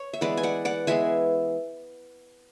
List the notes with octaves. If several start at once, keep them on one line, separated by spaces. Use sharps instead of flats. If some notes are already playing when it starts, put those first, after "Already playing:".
Already playing: C#5
E5
E3 G#3 B3 B4 D5
G#5
D5 F#5
D5 F#5
E3 G#3 B3 E5 G#5